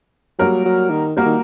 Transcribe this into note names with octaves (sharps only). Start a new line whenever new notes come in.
F#3 G3 A#3 F#4 A#4
F#3
D#3
G3 A#3 F#4 A#4
D#3